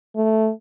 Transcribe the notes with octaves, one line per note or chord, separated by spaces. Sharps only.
A3